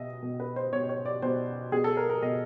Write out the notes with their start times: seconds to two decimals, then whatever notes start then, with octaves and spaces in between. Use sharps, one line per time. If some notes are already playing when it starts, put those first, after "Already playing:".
Already playing: B2 D#5 E5
0.23 B2
0.40 B4
0.56 C5
0.73 B2 C#5
0.89 C#5
1.05 D5
1.22 B2 C5
1.72 B2 G#4
1.84 A4
1.97 A#4
2.10 A#4
2.22 B2 D#5